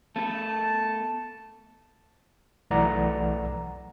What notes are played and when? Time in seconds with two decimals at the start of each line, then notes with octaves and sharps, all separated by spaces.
0.16 A3 B3 A4 A5
2.71 B1 E3 A3 D5 F#5 A#5